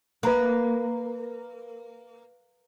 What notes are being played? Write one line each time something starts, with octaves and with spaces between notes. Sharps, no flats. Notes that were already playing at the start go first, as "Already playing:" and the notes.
A#3 B4 A#5 F#6